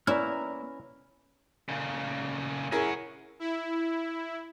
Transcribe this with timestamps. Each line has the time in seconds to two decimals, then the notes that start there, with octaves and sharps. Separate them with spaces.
0.07 A#3 C#4 E4 B4 D5 A#5 E6 F6
1.69 A#2 C#3
2.72 C#4 E4 F#4 G#4 A#4
3.40 E4